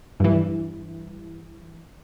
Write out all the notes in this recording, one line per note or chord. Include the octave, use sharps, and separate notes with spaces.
G2 E3